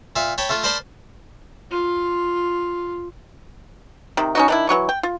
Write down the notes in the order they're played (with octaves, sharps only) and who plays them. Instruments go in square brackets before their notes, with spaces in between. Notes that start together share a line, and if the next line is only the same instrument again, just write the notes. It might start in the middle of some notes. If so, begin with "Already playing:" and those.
[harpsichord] A#2 E5 F5
C#5 G5 A5 B5
A3 F4 A4
A#4 C5 D5 A5 B5 C6
[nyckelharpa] F4
[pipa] C3 D#3
C#4 D#4 F#4
D#3 D4 E4
E3 F#3 C#6
G5
F4